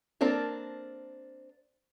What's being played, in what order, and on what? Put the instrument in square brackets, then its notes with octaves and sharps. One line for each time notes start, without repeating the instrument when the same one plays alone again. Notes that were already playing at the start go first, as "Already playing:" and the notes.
[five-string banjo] A#3 C4 D4 A4 A#4